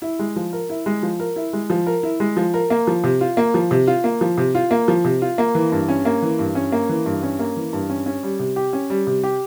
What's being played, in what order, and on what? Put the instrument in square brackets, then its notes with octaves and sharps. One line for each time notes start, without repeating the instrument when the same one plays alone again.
[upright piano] E4
G#3
F3
A#4
E4
G#3
F3
A#4
E4
G#3
F3
A#4
E4
G#3
F3
A#4
A#3
F3
C3
F4
A#3
F3
C3
F4
A#3
F3
C3
F4
A#3
F3
C3
F4
A#3
E3
G2
C#4
A#3
E3
G2
C#4
A#3
E3
G2
C#4
A#3
E3
G2
C#4
C#4
G3
C3
G4
C#4
G3
C3
G4